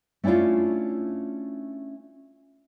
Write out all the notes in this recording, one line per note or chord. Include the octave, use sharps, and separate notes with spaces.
A3 C#4 D4 E4 F4